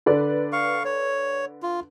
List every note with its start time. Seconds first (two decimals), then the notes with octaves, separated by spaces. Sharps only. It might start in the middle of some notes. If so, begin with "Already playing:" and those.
0.06 D3 B4 D5
0.52 F5 C#6
0.85 C#5
1.62 F4